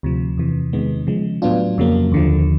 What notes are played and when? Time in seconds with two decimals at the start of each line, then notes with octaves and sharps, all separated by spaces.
0.03 D2 C3 F3
0.38 E2 C3 E3
0.73 E2 C3 D#3 G#3 B3
1.07 C#3 F3 G#3
1.42 A2 F#3 B3 D4 F4
1.78 F2 C#3 F#3 A#3
2.12 D#2 D3 F3